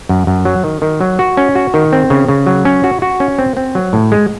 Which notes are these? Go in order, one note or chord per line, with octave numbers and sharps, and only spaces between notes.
F#2
F#2
F#3
D#3
D#3
F#3
F#4
C#4
F#4
D#3
C4
C#3
C#3
F#3
C#4
F#4
F#4
C#4
C4
C4
F#3
A2
G#3